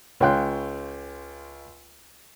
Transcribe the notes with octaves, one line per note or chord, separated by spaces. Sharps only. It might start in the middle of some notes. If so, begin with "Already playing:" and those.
C#2 C#5 F5 G5 C6 F#6